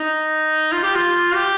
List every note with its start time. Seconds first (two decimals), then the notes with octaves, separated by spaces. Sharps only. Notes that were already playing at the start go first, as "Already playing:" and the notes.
Already playing: D#4
0.72 F4
0.83 G4
0.95 F4
1.34 G4